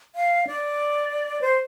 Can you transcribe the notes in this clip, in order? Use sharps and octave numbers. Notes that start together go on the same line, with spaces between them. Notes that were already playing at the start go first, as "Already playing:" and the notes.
F5
D5
C5